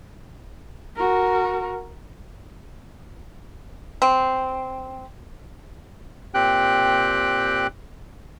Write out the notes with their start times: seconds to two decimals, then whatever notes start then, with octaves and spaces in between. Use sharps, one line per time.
0.96 F#4 A#4
4.02 C4
6.34 A#2 C4 G4 G5 F#6